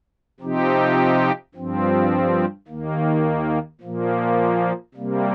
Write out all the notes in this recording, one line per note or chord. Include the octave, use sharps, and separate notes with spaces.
C3 F3 C4 D#4 G4
G2 F3 C4
D#2 D#3 A#3
A#2 F3 A#3
C3 G3 A#3